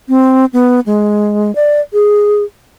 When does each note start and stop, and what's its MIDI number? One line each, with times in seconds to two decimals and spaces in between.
0.09 0.45 60
0.53 0.80 59
0.86 1.54 56
1.55 1.80 74
1.93 2.43 68